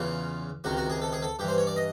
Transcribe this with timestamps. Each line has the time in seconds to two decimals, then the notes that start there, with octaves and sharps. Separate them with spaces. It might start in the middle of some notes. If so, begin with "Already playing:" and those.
Already playing: E2 C#3 E3 F4
0.64 C#2 C3 D#3 F#4
0.77 F#4
0.90 G#4
1.02 A4
1.13 G#4
1.22 A4
1.39 G2 G4
1.43 E3
1.48 C5
1.58 C#5
1.67 D5
1.76 D#5